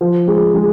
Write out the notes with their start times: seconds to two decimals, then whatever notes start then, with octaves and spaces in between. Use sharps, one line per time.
0.01 F3
0.28 G#3
0.54 G#3